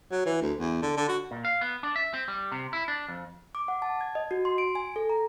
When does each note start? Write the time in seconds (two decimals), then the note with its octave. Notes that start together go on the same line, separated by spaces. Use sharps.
0.11 F#3
0.25 E3
0.42 D2
0.59 E2
0.82 D3
0.97 D3
1.08 F#4
1.31 A#2
1.45 F5
1.61 B3
1.83 D4
1.96 E5
2.14 C4
2.28 G3
2.52 C3
2.73 E4
2.88 D4
3.08 F2
3.55 D6
3.68 F#5
3.82 A5
4.01 G#6
4.15 D#5
4.31 F#4
4.45 C6
4.58 D7
4.75 G#5
4.96 A4
5.10 A#5